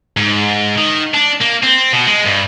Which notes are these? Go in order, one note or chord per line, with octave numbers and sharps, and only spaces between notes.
G#2
D#3
D4
A#3
C4
B2
G#3
G2